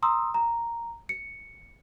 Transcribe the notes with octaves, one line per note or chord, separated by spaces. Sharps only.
A#5 C6 D#6 E6
A#5
C#7